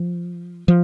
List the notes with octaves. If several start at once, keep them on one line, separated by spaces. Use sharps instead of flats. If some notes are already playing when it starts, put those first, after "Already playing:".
Already playing: F3
F3